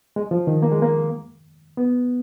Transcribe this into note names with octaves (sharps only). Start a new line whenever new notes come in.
G#3
F3
D#3
A#3
G#3
A#3
B3